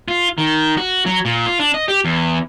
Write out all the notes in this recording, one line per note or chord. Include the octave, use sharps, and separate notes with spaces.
F4
D#3
F#4
F#3
A#2
F4
D4
D#5
G4
E2